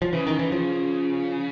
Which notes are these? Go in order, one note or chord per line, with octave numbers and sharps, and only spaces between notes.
F3
C#3 E3
D#3
E3
F3